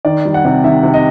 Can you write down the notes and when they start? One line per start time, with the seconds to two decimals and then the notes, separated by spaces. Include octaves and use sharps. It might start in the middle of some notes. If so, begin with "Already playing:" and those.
0.05 D#3 D5
0.25 G3
0.34 F#5
0.45 C3
0.64 D#3 E5
0.83 C3
0.94 D#5